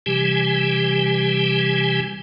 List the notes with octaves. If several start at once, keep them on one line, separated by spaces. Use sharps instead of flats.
C3 E3 G3 G4 G#5